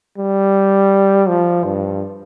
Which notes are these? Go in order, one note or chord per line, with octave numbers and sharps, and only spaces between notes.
G3
F3
G2